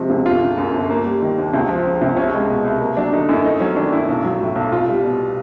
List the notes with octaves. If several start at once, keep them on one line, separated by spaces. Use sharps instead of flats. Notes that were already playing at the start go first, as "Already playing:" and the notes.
Already playing: C3 F3 G#3 F#4
C#2
G1 F4
C#3
F#2
G1
A#3
G3
D#3
D#2
C#2
F3
C#3
C#2
C2 C#4
G#3
B2
C2
A#3
F#3 D4
D3 D#4
F#2 E4
A3 D#4
F#3 C#4
D#3 D4
F#2 E4
B1
F#3
A2
B1
C2 F4
G3
B2